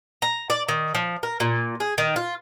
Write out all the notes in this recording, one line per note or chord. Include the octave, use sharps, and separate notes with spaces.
A#5
D5
D#3
F3
A#4
A#2
G#4
D#3
F4